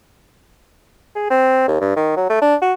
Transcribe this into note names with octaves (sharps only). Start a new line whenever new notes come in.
G#4
C4
D#2
G2
D#3
F#3
A3
D4
F#4